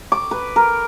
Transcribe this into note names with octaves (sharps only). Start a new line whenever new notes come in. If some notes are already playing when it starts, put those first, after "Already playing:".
D6
B4
A#4